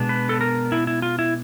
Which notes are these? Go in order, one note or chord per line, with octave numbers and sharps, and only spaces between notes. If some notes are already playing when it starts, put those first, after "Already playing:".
Already playing: B2 G#3 B3 D4
B4
A4
A#4
E4
E4
F4
E4